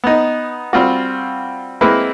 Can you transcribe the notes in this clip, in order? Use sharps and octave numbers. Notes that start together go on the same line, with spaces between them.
B3 D#4
G3 C4 F4 F#4
G#3 A#3 C4 E4 B4